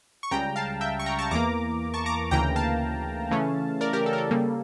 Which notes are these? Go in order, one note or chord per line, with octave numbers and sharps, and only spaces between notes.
C#6
C#2 C#3 G3 G5 A#5
F5 A5
E5 G5
C#6
G5 A#5
A5 C#6
E2 E3 A#3 A#5 D6
A5 C#6
A#5 D6
D2 C#3 E3 A#3 G5 A#5
F5 A5
C#3 E3 A3 C#4
A#4 D5
G4 A#4
A4
A#4
A4
C#3 G3 A#3